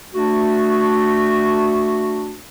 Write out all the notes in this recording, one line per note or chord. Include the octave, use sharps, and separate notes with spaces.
A3 D4 F#4